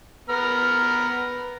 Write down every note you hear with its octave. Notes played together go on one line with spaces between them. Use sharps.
B3 A#5 F6